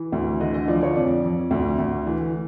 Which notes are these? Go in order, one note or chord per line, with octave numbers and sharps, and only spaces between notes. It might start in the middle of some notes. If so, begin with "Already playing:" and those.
Already playing: E3
D2
D3 D#5
D#5
F3 D5
C#5
F2 D5
F2
D2
D2
E3